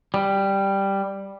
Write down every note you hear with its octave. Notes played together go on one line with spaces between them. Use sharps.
G3